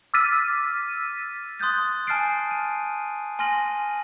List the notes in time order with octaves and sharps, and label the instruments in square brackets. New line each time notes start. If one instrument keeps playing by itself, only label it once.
[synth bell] D6 E6 F6 A6 B6 D#7
[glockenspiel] C6 D#6 F#6 G6 A6
G#5 A5 F6 A6 C7 D7
D#7
G#5 C6 F6 A#6 D#7 F#7